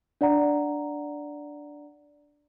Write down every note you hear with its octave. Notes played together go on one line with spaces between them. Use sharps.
D4 D5 F#5 A#5